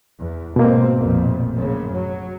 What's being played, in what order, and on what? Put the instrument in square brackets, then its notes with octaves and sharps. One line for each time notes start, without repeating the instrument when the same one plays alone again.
[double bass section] E2
[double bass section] G#2 C4 [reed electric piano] B2 A#3
[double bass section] A1 F2 A#2
F#2 C#3
F#3